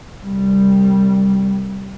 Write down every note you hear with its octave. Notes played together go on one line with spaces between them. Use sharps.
C2 G3